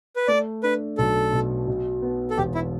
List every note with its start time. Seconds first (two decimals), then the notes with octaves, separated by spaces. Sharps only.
0.16 B4
0.28 A3 D5
0.63 D4 B4
0.98 B1 A4
1.33 B2
1.67 B2
2.02 B3
2.30 A4
2.37 E1 G4
2.54 E4